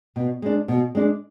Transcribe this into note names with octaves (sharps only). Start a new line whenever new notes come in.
B2
G#3 D4
B2
G#3 D4